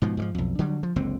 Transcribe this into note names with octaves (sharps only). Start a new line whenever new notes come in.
G#2 B2 F3
G#2 E3 F3
B1 F2
D3 F#3 G3
F3
F#1 C#2 D3 C4